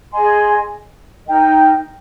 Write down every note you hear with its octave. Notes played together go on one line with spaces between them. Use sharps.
G#4 D#5 G#5 C6
D#4 A#4 D#5 G5